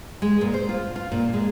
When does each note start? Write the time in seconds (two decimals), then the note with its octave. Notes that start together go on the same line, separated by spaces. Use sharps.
0.22 G#3
0.41 A#2
0.54 C5
0.69 F4
0.96 F4
1.12 A#2
1.33 G#3